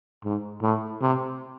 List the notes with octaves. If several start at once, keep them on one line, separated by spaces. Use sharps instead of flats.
G#2
A2
C3